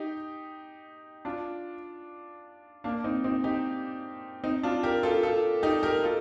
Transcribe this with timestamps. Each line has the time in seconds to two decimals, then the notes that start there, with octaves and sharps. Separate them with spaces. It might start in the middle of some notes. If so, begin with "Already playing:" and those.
Already playing: D#4 G4
1.25 D4 F4
2.84 A#3 D4
3.04 C4 D#4
3.24 C4 D#4
3.44 D#4 G4
4.44 C4 D#4
4.63 D4 F4
4.83 G4 A#4
5.03 F4 A4
5.23 F4 A4
5.63 D#4 G4
5.83 G4 A#4
6.03 F4 A4